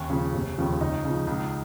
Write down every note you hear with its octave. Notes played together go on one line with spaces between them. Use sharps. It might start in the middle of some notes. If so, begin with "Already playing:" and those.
Already playing: D#2 C#4 C#5
C#3 F3
F1
D#2 C#3 F3
C#2 D#4 D#5
C#3 F3
C#2